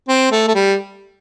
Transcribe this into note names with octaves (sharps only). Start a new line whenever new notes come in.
C4
A3
A3
G3